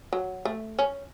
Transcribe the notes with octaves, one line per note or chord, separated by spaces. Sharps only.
F#3
A3
C#4